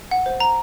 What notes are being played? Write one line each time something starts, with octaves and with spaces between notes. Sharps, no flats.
F#5
C5
A#5